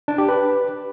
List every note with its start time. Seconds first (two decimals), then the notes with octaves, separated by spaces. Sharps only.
0.08 D4
0.18 G4
0.29 B4